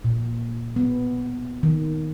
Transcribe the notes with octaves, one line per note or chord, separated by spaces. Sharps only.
A#2
B3
D#3